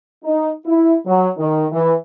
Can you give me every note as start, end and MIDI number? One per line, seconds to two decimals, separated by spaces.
0.24 0.50 63
0.66 0.96 64
1.06 1.27 54
1.37 1.66 51
1.72 1.92 52